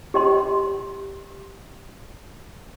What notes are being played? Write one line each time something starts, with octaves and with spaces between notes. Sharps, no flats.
G4 D#5 C6